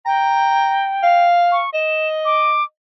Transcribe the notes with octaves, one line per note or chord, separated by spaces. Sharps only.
G5 A#5
F5
C#6
D#5 E7
D6